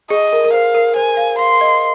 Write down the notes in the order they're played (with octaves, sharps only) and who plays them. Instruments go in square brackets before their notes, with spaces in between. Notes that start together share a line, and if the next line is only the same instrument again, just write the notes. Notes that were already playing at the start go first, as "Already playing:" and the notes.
[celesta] G#4 [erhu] D#5
[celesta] A#4
A#4
[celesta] C5 [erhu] F5
[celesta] A#4
[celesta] C5 [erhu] G#5
[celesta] F5
[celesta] F5 [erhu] C6
[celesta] D#5